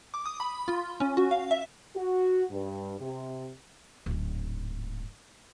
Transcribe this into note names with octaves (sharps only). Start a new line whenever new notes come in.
D6
D#6
B5
F4
C#4
F#4
F5
E5
F#4
G2
C3
D1 G#2